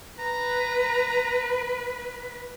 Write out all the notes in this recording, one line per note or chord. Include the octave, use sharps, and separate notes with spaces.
B4 A#5